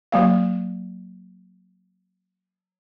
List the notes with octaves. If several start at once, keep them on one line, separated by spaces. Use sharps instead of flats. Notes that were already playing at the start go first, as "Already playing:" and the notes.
F#3 A#3 F5